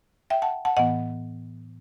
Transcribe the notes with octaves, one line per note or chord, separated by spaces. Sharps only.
E5 G5
F#5 A5
F#5 A5
A2 E3 B3 D#5 F#5